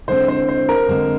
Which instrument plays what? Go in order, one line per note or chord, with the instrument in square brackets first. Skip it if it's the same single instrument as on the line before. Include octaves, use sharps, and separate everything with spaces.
[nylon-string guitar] D3 G#3 C4 [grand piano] C5
[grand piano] C5
C5
A#4
[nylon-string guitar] D3 G#3 C4